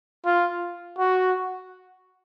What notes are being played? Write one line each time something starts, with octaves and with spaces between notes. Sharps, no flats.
F4
F#4